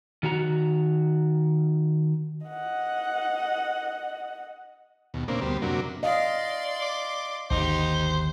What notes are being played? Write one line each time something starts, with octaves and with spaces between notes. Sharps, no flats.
D#3 F#4 A#5
D#5 F#5
D#2 B2
A#2 C#3 A#3 C4 D4
D2 G3 B3 C5
F#2 C3 F#3 A#3 D4
D5 D#5 F5 C6
D6
G#1 D#2 D3 D#4 G4 C5